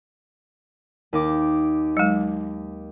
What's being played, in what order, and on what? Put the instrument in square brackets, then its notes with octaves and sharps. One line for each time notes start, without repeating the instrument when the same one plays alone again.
[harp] D#2 D#4 D6
[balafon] F#3 G#3